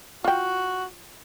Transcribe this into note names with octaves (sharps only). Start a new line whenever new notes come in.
F4 F#4 G5